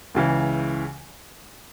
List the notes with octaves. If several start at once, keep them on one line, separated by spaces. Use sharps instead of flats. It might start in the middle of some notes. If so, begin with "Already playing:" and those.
C#2 C#3 E3